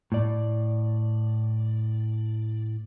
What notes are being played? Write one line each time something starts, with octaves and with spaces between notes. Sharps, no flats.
A2 D5